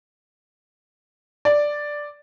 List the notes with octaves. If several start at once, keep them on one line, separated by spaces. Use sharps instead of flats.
D5